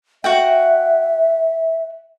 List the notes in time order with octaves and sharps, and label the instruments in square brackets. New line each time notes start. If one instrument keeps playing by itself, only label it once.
[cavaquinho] F#4 F#5 G5 [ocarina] E5